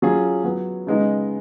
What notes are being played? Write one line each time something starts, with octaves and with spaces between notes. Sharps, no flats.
F#3 C#4 F4 G#4
F#3 B3 F#4
C#3 G#3 B3 D#4